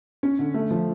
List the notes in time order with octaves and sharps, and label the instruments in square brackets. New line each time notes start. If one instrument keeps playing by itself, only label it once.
[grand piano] C#4
D3
A3
F3